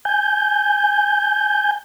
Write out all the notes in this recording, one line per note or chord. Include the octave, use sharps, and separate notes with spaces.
G#5 G6